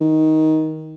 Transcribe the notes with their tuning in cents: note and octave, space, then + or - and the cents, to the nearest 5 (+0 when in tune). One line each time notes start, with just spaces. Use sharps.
D#3 +15